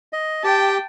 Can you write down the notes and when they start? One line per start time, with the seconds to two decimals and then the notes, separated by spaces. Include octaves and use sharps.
0.13 D#5
0.44 G4 G5 A5